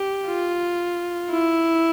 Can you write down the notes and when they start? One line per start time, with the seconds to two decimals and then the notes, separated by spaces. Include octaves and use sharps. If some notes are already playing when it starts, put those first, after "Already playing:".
Already playing: G4
0.27 F4
1.31 E4